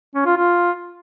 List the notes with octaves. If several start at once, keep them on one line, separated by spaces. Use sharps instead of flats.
C#4
F4
F4